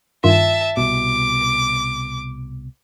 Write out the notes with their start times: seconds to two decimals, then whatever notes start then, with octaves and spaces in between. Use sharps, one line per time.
0.24 G2 D#3 F4 E5 A5
0.77 C2 B2 D6